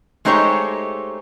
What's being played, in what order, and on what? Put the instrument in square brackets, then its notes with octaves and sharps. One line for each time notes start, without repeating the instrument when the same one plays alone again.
[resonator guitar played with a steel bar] G#3 A3 D#4 G4 C5 C#5